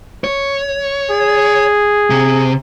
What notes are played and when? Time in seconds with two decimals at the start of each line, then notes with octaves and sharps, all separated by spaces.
0.24 C#5
1.11 G#4
2.10 C3